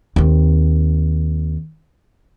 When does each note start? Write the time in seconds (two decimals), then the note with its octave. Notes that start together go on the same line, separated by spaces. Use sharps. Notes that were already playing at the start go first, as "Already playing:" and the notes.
0.16 D#2 C4